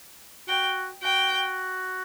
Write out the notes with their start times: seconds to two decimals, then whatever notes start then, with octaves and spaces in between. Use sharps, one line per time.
0.49 F#4 G5
1.03 F#4 G5